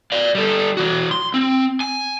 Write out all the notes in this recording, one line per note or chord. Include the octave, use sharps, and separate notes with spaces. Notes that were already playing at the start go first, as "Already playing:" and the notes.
D5 F5
G3 A4
E3 F#4
C6
C4
G#5